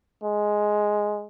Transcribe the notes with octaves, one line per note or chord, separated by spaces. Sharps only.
G#3